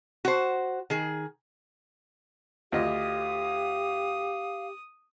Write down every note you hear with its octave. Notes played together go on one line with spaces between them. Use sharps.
F#4 C5
D#3 G#4
D2 F4 G4 D#5 F5 D#6